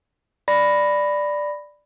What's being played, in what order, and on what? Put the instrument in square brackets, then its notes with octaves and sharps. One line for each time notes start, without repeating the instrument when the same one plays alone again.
[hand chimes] D5 B5 A#6